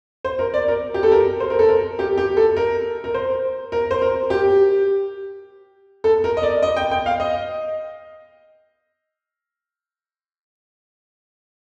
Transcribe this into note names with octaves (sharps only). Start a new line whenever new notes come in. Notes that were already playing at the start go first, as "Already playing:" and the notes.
C5
A#4
D5
A#4
G4
A4
A#4
C5
A#4
A4
A#4
G4
G4
A4
A#4
A#4
C5
A#4
C5
A#4
G4
A4
A#4
D#5
D5
D#5
G5
G5
F5
D#5